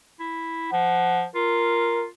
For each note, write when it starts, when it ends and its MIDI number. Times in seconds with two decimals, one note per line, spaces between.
0.20 0.68 64
0.72 1.25 53
0.72 1.25 78
1.35 2.08 65
1.35 2.06 70